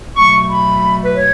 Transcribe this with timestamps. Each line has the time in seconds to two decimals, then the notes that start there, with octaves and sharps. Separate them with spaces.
0.16 B2 F#3 A3 C#6
0.50 B5
1.04 B4
1.15 C#5